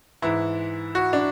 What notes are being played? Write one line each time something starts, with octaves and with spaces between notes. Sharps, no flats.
G#2 E3 E4
F#4
D4